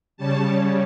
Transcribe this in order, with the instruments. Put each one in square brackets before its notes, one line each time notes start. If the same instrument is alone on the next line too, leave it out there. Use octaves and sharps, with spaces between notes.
[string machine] C#3 G3 C#4 A5